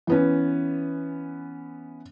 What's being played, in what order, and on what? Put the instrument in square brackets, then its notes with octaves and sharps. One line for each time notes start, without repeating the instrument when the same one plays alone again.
[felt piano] E3 B3 C#4